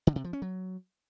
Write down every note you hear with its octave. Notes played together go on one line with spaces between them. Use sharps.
D3
C3
F3
C#4
F#3